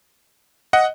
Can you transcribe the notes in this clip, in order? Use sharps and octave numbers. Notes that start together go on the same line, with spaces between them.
D#5 F#5